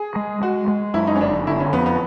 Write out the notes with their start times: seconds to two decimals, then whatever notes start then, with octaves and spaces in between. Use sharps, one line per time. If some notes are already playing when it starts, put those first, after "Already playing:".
Already playing: G#4
0.16 G#3
0.42 G#3 F#4
0.68 G#3
0.94 F#2 E4
1.07 D#4
1.16 C#4
1.21 G1 D4
1.47 D3 E4
1.60 C#4
1.73 F2 B3
1.86 B3